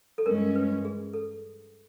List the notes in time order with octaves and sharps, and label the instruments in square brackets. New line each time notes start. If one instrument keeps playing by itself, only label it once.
[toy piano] A4
[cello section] G2 E3 G#3 C#4 [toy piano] A#4
[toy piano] B4
G#4
A4